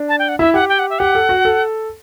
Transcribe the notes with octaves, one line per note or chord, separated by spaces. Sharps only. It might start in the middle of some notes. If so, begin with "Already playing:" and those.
Already playing: D4
A5
G5
F#5
E4 E5
G4 F#5
G5
F#5
E5
G4 F#5
A4
F#4
A4